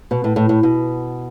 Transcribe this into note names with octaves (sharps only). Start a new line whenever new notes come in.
B2
A2
A2
A2
B2